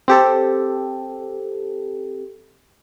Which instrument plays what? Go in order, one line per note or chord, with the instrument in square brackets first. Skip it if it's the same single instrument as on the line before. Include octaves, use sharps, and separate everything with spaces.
[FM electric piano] C4 G4 A4